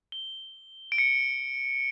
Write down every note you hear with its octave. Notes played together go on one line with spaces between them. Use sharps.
G7
D7
C#7